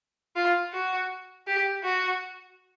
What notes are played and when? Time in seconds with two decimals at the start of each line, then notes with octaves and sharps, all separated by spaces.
0.36 F4
0.73 F#4
1.47 G4
1.83 F#4